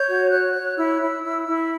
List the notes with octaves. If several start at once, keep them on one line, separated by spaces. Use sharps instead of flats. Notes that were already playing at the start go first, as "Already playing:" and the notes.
Already playing: C#5 G6
F#4
C#5 F#6
C#5
E4 E6
E4
E4
E4